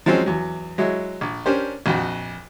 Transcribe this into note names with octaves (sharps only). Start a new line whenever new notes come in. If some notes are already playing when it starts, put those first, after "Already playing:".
F3 F#3 G#3 C4 C#4
E2 F#3
F#3 G#3 E4 C#5
A#1
C#4 D4 G4 A#4 C5
A#1 F2 F#4 F#5 G5